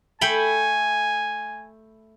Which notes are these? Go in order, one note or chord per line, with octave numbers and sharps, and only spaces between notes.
A3 G5 G#5 B5